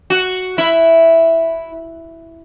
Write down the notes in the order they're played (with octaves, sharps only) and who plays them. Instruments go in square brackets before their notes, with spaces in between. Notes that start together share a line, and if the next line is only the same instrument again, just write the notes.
[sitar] F#4
E4